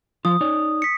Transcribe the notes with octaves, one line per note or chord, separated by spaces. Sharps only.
F3 F4 D#6
D#4 C#5 D5
B6 C#7